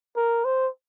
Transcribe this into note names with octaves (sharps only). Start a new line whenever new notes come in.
A#4
C5